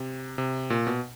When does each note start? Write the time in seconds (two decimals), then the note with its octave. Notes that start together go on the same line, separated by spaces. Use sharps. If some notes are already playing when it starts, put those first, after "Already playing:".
Already playing: C3
0.38 C3
0.70 A#2
0.87 B2